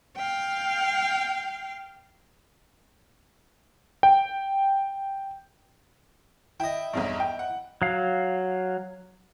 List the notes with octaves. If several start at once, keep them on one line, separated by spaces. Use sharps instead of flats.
F5 G5
G5
E4 D#5 G5
B1 E2 G2
G5
F#5
F#3 F5